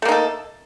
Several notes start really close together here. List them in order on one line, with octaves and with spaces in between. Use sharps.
A3 A#3 D#4 A4